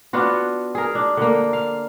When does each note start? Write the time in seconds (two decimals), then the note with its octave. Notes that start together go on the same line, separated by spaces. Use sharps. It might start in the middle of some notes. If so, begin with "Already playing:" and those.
0.13 B3 D4 F4 F#4
0.75 G#4 A#4
0.95 D4
1.17 D3 A#3
1.53 F5